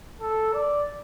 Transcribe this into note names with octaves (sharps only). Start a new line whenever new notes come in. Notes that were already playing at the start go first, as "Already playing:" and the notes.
A4
D5